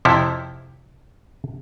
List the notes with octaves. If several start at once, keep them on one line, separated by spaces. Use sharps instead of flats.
F2 C3 F3 E4 C#5